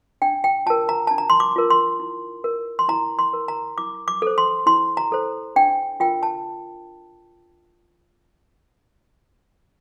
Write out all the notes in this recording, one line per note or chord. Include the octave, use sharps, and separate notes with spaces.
D4 G5
G5
F4 A#4 A5
A#5
D4 A5
A#5
C6
D6
F4 A#4
C6
E4
A#4
C6
E4 A#5
C6
A#4
A#5
E4 D6
D6
A4 C5
C6
E4 C6
A#5
A4 C5
D4 G5
F4 A#4 G5
A5